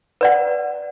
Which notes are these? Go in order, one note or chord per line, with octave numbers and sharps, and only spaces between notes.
B4 D5 F#5